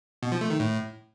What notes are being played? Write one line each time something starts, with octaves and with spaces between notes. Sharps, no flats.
B2
F3
A3
D#3
A2